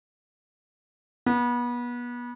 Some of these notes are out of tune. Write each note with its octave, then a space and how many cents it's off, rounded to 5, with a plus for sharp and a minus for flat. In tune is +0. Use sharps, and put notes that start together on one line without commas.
B3 -30